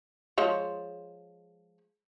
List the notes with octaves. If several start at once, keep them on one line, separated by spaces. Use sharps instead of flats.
F3 G#3 C#5